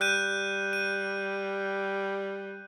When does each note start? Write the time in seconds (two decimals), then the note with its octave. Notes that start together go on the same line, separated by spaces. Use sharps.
0.01 G3 F#6 G6 D#7
0.73 D#7